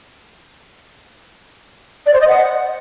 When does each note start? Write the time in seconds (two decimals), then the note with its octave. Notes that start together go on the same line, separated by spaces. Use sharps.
2.06 D5
2.13 C5
2.20 D#5
2.27 F#5